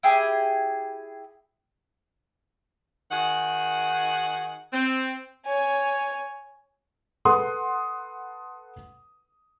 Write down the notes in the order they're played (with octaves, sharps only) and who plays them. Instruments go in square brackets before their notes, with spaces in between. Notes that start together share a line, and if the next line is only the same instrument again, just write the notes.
[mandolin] E4 G4 G#4
[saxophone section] D#3 F#4 G#4 F#5
C4
[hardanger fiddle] C#5 G#5
[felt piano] A4 B4 F#5 C6 D#6